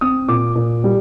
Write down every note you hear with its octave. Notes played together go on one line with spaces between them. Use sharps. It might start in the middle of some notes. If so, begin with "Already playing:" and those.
C4 D#6
A#2 D6
A#2
G3